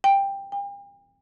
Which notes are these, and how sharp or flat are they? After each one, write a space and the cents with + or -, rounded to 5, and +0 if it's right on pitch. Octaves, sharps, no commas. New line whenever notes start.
G5 +10
G5 +40